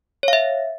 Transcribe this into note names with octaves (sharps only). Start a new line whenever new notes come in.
C#5 E5 F5